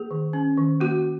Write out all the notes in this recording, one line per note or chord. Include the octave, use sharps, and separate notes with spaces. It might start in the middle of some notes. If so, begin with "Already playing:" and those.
Already playing: A#3 G#4
D#3
C#4
D#3
A#3 F#4